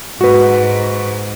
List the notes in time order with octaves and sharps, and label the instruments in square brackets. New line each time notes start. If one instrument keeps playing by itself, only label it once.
[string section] G#2 [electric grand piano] F#4 B4